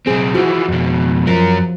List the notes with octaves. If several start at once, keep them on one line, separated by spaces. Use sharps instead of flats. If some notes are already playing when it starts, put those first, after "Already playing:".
B1 C4 G#4
E3 F3 F#4
F2 B2
F#2 F3 A#4